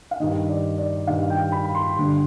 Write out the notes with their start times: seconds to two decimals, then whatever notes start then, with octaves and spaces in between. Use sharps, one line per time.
0.11 F5
0.20 G2 D#3 D#5
0.49 D5
0.78 D5
1.07 G2 D#3 F5
1.30 G5
1.52 B5
1.75 C6
1.96 G2 D3